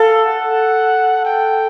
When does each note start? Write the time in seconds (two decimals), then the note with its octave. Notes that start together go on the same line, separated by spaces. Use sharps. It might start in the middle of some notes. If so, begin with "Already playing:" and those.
Already playing: A4 F5
0.25 F#5
1.25 G5